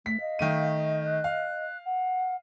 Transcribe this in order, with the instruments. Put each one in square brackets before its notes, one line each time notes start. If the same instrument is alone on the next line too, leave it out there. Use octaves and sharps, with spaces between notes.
[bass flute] A3 [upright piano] B6
[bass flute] D#5 [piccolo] F5
[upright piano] D#3 A3 D#7
[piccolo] F#6
[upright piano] F5
[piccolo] F#5